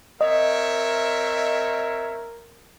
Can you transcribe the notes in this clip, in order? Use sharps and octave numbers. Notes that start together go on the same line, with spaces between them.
C4 A#4 C#5 D#5 E5